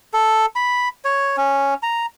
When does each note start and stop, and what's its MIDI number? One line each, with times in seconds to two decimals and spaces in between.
0.14 0.46 69
0.56 0.88 83
1.05 1.36 73
1.37 1.74 61
1.83 2.06 82